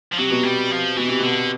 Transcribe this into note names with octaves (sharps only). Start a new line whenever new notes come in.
F3
C3 F#3
B2
C3 G3
F3
B2 E3
C3
B2 D3